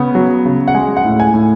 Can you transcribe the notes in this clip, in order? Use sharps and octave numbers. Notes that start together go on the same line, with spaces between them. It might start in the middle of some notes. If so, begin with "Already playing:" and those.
Already playing: C#3 B3
F#3
C#3
F#5
G#3 G#5
F#5
A2
G#5
A2